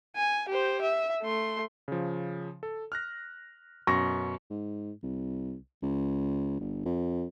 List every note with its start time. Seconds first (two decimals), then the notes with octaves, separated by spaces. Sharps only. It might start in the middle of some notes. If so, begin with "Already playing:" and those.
0.16 G#5
0.49 G4 C5
0.82 E5
1.22 A3 C6
1.88 C#3 F3
2.63 A4
2.92 F6 F#6 A#6
3.87 F#2 B2 C#6 A#6
4.50 G#2
5.03 C2
5.82 C#2
6.60 G1
6.85 F2